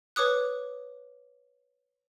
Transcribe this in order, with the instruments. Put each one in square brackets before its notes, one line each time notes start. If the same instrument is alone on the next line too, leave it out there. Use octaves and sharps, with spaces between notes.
[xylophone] B4 C#5 D6 D#6 F#6